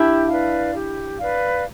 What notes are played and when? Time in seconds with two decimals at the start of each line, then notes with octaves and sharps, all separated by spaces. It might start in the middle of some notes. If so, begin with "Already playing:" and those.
Already playing: D4 E4 G4
0.29 B4 D5 F5
0.73 G4
1.19 B4 D5 F5